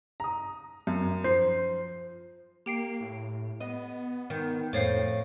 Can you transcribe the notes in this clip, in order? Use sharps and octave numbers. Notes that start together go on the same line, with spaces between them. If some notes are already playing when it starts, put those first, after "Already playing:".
A#5 D#6
F#2
F3 C5 C7
A#3 G4 G5 C7
A2
B3 D#5
D#3
F2 A2 C5 C#5 F5